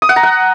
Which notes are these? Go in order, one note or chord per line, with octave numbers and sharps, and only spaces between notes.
D#6
F#5
A#5
F#5